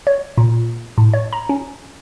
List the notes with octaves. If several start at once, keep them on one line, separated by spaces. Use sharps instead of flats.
C#5
A#2
A2
C#5
A#5
C#4